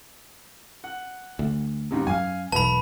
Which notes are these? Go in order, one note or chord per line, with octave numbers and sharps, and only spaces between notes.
F#5
D2
D#2 G#2 C3
F#2 F5 G#5
E1 B1 B4 A5 B5